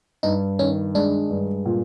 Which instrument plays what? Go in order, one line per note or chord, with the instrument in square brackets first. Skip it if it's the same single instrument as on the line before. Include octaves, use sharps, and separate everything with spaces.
[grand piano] G2 [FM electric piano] D#4
[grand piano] D#3 [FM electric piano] C#4
[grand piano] G#3 [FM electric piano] D4
[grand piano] G2
A#2